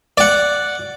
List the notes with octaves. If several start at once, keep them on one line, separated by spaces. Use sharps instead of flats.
D5 F#5